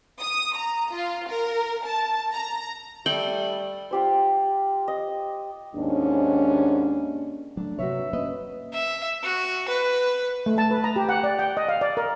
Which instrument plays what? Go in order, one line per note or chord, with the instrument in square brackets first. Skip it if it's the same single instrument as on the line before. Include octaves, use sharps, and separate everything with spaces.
[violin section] D#6
A#5
F4
A#4
A5
A#5
[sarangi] G3 [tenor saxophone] A3 [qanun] G5 [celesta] F#7
[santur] F4 G4 C5
D#5
[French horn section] D#2 G#2 C#4 D4
[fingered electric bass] F#3 A3 [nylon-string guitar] D4
[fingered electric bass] C3 F#3 A#3 [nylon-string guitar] F#4 B4 C#5 [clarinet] E5
[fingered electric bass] A#3 C4 C#4 [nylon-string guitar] A#4 B4 D#5
[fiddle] E5
F#4
B4
[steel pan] A3
A5
B4
A#5
G4
F#5
D5
G5
D#5
F5
D5
A#4